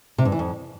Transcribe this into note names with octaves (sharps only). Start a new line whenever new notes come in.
C3
G2
E3
F2